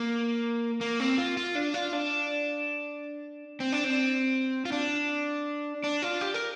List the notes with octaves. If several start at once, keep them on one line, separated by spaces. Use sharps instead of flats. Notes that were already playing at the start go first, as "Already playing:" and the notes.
Already playing: A#3
A#3
C4
F4
F4
D4
F4
D4
C4
D4
C4
F4
D4
D4
F4
G4
A#4